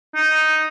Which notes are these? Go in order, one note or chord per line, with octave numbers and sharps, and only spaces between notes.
D#4